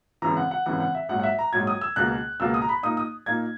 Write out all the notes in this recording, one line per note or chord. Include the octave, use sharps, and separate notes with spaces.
G#1 F#2 C#3 E3 A#5
F#5
F#5
G#1 F#2 C#3 E3 F#5
F#5
E5
A#1 G#2 F#3 F#5
F#5
E5
A#5
A#1 G#2 F#3 G#6
D#6
E6
C#2 B2 A#3 F#6
C#2 B2 A#3 E6
D#6
A#5
B5
A#2 A#3 D#4 D#6
D#6
A#2 A#3 D#4 G#6